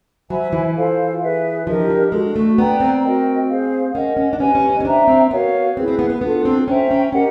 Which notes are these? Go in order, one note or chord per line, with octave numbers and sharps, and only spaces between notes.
F#3 C5 E5 G#5 B5
E3
F4 A4 C5 F5
G#4 B4 E5
F3 D4 G4 A#4 D#5
F3
G#3 D4 F#4 A4
A3
B3 B4 D5 G5 A#5
C4
F#4 A#4 D#5 G5
G#4 C5 F5
C#4 A#4 D#5 F#5
C#4
D4
C#4 G4 B4 D#5 G#5
C#4
C#4
C#4
D4 C5 E5 G5 A#5
C4
B3 F#4 A#4 C#5 F5
C4 E4 G#4 B4
C4
B3
B3
B3 D4 F4 A4
C4
C#4 C5 E5 G5 A#5
C#4
C#4 G4 A#4 D#5 F#5